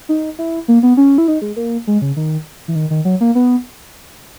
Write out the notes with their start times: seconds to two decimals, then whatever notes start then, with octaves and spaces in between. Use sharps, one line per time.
0.09 D#4
0.39 E4
0.68 A#3
0.83 B3
0.97 C#4
1.18 E4
1.28 D#4
1.42 G#3
1.56 A#3
1.87 G#3
2.02 C#3
2.16 D#3
2.68 E3
2.75 D#3
2.90 D#3
3.05 F#3
3.21 A#3
3.35 B3